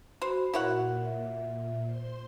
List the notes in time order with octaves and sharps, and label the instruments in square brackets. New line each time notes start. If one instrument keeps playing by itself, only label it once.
[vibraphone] F#4 B5 [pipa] C5
[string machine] A#2 [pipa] E4 C#5 F#5 [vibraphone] F#4 A#4
[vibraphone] E5
[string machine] C5 C6